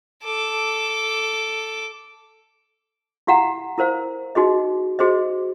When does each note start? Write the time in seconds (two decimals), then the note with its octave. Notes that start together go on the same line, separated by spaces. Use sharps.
0.24 A4 D6
3.27 E4 G4 F5 F#5 A#5
3.78 E4 A#4 C5 F5
4.35 D#4 F#4 G#4 D#5
4.99 F#4 G#4 C5 D#5